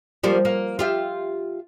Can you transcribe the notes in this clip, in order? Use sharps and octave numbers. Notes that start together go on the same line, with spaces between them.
F3 G3 A#3
A#3
F4 G4 E5